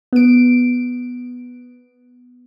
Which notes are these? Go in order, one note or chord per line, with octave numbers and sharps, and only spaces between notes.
B3 D7